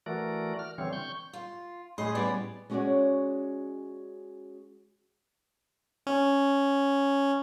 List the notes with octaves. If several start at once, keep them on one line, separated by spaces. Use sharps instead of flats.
E3 A3 F#4 A#4 D5
F6
D3 E3 G3 C4 C#5
C#6 G6
F4
A2 G#4 D#5 B5 C6
G3 B3 C#4 D5
G#3 C#4 F#4 G#4 C#5 D5
C#4